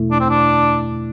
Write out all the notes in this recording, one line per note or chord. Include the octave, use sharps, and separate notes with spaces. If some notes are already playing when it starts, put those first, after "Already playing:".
Already playing: E2 B2 A3 E4
D4
C4
D4